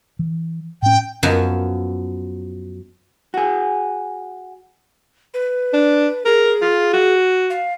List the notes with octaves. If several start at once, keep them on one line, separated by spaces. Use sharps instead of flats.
E3
A2 C#4 G5
F#2 F3 F#3 B3
F#4 G#4
B4
D4
G#4 A#4
F4
F#4
F5